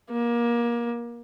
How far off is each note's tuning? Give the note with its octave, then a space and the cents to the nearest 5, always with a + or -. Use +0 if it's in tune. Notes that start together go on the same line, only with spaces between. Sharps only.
A#3 +25